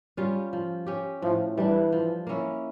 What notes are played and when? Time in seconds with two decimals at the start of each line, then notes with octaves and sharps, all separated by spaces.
0.17 G3 C#4 F4
0.53 F3
0.86 C#4 G4
1.22 A2 F3
1.57 E3 G3 D4
1.92 F3
2.27 A#3 C#4 E4